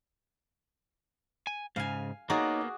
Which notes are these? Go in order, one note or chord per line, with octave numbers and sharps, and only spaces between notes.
G#5
G#2 C#3 F5 G#5
A#3 B3 D#4 F#4 G#4 C#5 D5 A#5